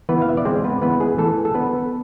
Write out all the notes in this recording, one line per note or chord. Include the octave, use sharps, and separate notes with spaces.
E3 B3 B4
F5
E5
D5
G#3 C4 C5
B3 B4
E3 B3 B4
G#3 G#4
E3 A3 A4
A4
B3 D4 B4